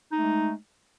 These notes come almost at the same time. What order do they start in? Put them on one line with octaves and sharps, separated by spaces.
D#4 A3 G#3